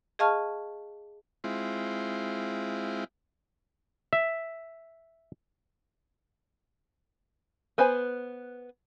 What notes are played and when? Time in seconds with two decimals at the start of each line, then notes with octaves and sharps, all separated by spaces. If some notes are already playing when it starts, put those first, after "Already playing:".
0.19 G#4 D#5 F5 A5 C#6 F6
1.44 G#3 C4 E4 F4
4.13 E5
7.78 B3 B4 C5 G#5